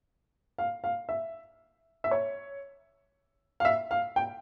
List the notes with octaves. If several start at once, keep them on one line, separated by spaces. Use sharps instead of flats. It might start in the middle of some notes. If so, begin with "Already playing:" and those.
F5
F5
E5
E5
C#5
F5
E5
F5
G5